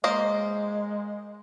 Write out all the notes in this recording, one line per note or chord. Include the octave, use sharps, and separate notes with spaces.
G#3 A#3 C5 D#5